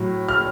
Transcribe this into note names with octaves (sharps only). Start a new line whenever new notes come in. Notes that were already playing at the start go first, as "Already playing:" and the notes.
Already playing: A2 F#3
F6